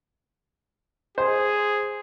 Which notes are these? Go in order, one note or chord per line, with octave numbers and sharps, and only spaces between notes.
G#4 C5